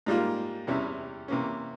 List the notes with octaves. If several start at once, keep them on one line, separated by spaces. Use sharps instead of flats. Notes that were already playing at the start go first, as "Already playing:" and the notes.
G#2 G3 A#3 F4
E2 C3 G3 C#4 E4
C3 E3 A#3 C#4